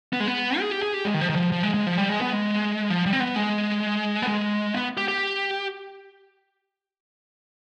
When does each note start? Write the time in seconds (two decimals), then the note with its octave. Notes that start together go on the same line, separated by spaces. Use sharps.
0.13 B3
0.20 G#3
0.27 B3
0.59 G#4
0.71 G4
0.82 G#4
0.94 G4
1.05 G#3
1.14 D#3
1.21 F3
1.29 D#3
1.36 F3
1.52 F3
1.63 G#3
1.74 G#3
1.87 F3
1.98 G3
2.09 G#3
2.21 B3
2.33 G#3
2.90 F3
3.06 G3
3.13 C4
3.20 B3
3.36 G#3
4.22 B3
4.28 G#3
4.74 B3
4.97 G4
5.08 G4